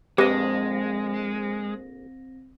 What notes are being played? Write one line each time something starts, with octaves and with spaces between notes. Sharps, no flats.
A#1 F2 G#3 C4 G4 B4 D#5 A#6